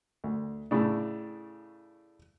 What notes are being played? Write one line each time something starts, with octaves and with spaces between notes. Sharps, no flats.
D2
A2 C#3 A3 D4